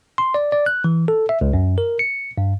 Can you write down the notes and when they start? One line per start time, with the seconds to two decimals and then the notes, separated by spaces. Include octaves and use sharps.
0.18 C6
0.34 D5
0.52 D5
0.66 F#6
0.84 E3
1.08 A4
1.29 E5
1.41 C#2
1.53 F#2
1.78 A#4
1.99 C#7
2.38 G2